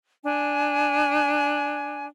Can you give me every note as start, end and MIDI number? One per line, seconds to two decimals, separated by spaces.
0.24 2.07 62
0.24 2.07 80